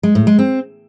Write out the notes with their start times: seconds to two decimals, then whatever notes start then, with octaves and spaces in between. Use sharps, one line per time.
0.03 G#3
0.15 A2
0.27 G#3
0.39 C4